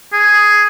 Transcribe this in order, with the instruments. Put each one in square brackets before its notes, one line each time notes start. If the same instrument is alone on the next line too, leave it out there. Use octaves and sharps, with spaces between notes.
[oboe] G#4